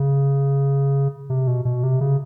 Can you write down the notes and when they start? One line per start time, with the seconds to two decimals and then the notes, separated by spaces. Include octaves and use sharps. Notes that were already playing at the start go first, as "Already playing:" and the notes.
Already playing: C#3
1.30 C3
1.47 B2
1.65 B2
1.83 C3
2.01 C#3